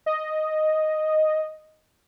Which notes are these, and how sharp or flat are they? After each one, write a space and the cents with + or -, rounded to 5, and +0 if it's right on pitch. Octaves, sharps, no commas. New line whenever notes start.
D#5 +0